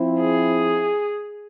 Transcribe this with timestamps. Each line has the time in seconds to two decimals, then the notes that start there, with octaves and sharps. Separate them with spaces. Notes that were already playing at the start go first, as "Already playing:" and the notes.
Already playing: F3 C4 E4
0.20 G#4